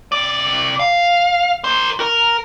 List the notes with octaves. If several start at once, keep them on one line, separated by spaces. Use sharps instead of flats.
C3 D5
F5
A#4 C5
A#4